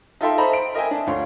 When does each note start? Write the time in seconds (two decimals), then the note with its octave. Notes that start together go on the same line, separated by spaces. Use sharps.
0.21 D#4 F4 A4 E5 G5 C6
0.37 A4 C5 D#5 A#5 B5
0.53 D7
0.74 A#4 D#5 E5 G5 G#5
0.91 D4
1.07 D2 F4 C#5 C6